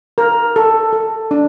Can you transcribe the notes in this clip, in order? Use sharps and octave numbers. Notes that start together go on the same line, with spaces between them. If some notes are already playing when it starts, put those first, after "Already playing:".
A#4
A4
A4
D4